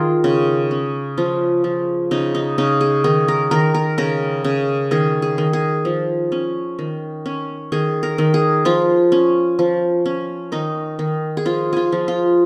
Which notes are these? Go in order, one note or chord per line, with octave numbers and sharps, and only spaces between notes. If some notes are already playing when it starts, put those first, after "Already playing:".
Already playing: D#3 F4 G#4 A#4
C#3
C#4
F3 F4
F3
C#3 D#4
D#4
C#3 D#4
G#4
D#3 G#4
A#4
D#3 A#4
A#4
C#3 A#4
C#3
D#3 G#4
G#4
D#3
G#4
F3
C#4
D#3
C#4
D#3 G#4
A#4
D#3
G#4
F3 F4
C#4
F3
C#4
D#3 D#4
D#3
G#4
F3 F4
F4 G#4
F3
F4